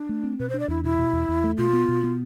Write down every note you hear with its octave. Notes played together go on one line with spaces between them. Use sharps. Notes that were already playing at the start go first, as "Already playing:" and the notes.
Already playing: D4
A3
C4
B2 B4
C5
D4
D5
E2 E4
B2 E4
B2
E2
E2
A3
B2 F4
B3
B2
B3